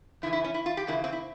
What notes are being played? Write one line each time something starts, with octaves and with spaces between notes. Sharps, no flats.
F2 C#3 E3 E4
E4
C#4
E4
F4
G4
E2 C#3 A#3 E4
C4
E4